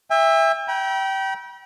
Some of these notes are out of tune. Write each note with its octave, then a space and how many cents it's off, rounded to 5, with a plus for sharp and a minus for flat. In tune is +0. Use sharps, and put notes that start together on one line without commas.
E5 +0 G5 +45
G5 -20 B5 -45